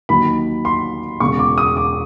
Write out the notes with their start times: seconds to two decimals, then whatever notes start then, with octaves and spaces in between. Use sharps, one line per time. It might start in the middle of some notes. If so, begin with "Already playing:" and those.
0.09 D#2 D#3 F#3 B5
0.65 C6
1.20 E1 E2 C#3 C#6
1.39 D6
1.58 D#6
1.77 D6